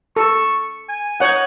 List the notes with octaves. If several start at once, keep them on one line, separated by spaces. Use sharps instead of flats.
A4 C#6
G#5
D#4 C#5 F#5